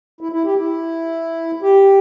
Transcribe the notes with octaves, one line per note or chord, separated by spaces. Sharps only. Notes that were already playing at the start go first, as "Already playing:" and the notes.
E4
E4
G4
E4
G4